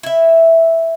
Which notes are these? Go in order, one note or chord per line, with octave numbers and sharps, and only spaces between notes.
E4 E5